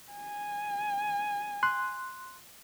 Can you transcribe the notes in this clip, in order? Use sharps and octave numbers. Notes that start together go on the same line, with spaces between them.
G#5
C6 F#6